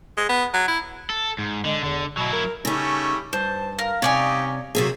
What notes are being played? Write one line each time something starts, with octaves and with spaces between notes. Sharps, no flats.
G#3
B3
F#3
E4
A4
G#2
D3 G#3
E2 D3
B2 F#3 E4
A#4
C#3 G3 A3 C#4 D#4
G2 C5 A5
A#4 F5
C3 C#4 D#4 G4 C#5 D5 G#5
C3 F#3 A3 A#3 C4 C#4 G#4